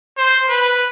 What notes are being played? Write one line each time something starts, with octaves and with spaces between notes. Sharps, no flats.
C5
B4